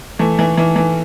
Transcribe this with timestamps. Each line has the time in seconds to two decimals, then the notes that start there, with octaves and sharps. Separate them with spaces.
0.19 E3 A3
0.39 E3
0.57 E3
0.76 E3